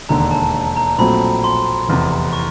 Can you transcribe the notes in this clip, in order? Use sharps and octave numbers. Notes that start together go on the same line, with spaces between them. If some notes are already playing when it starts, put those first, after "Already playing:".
E1 D#2 D3 A#5
A5
A#5
A#1 A#2 F#3 A3 C4 B5
C6
F1 E2 C3
C#6